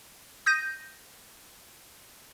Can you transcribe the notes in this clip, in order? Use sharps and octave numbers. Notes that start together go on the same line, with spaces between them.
D#6 G6 A#6 D#7